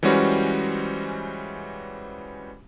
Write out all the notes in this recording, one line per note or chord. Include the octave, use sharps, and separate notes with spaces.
E3 G3 G#3 C#4 F#4 C5